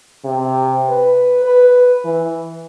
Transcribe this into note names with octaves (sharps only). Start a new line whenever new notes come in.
C3
B4
B4
E3